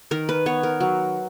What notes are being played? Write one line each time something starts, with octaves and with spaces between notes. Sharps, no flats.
D#3 A#4
B4
B3 C#5
A#4
F#3